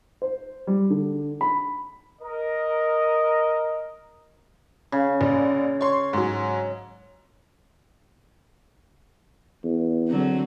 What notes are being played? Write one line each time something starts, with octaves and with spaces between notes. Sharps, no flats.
C5
G3
D3
B5
A#4 D#5
C#3
A#1
C#5 C6
G#2 F#3
E2
D3 F#3 C4